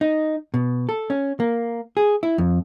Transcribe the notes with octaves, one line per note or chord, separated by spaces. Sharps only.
D#4
B2
A4
C#4
A#3
G#4
E4
F2